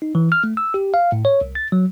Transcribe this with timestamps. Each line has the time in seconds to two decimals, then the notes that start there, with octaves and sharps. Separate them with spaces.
0.02 D#4
0.15 E3
0.32 F6
0.44 A3
0.57 E6
0.74 G4
0.94 F5
1.12 A2
1.25 C#5
1.41 C2
1.55 A6
1.72 F#3